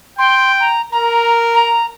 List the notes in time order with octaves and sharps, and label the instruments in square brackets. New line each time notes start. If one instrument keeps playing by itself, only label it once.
[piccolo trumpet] G5 [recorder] C6
[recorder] A#5
[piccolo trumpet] A#4 [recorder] A#5
[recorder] A#5